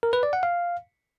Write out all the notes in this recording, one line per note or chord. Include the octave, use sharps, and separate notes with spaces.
A#4
B4
D5
F#5
F5